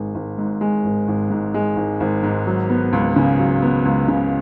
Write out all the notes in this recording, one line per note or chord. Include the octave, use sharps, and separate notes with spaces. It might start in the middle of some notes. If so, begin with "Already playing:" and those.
Already playing: G#1 G#3
G#1
G#2
G#3
G#1
G#1
G#2
G#3
G#1
G#1
G#2
F#3
B3
C#2
C#3
F#3
B3
C#2
C#3